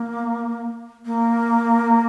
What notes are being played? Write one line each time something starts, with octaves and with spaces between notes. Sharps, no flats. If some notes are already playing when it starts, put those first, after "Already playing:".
Already playing: A#3
A#3